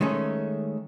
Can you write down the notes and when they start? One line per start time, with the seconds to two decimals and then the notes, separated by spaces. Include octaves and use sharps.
0.01 D#3 G#3 A3 C#4